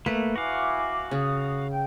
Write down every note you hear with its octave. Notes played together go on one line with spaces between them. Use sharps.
A3 A#3 B4
E4 F#4 F5 G#5 D6
C#3 D#6
G5